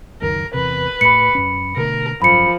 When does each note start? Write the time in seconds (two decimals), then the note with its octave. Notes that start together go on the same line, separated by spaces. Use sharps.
0.22 C#2 F#2 D#3 A#4
0.54 E2 C3 B4
1.01 A2 B5 C#7
1.35 F#2 C#4
1.77 B2 D3 A3 A#4
2.22 G#1 F#2 F3 B5 C#7